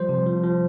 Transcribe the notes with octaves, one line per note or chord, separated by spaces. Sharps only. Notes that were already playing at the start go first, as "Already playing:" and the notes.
Already playing: F3 G3 C5
C3
F3
F3